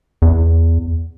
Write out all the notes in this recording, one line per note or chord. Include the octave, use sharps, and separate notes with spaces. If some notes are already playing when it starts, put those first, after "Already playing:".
E2